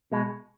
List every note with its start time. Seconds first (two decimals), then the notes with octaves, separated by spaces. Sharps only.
0.12 B2 G#3